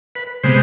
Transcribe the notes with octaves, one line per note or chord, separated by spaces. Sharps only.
B4
C3 G#3 B3 C5